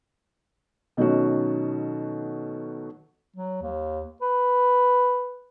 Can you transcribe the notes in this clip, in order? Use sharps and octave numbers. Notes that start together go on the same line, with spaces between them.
B2 D#3 F#3 A3 C#4 F#4
F#3
D#2
B4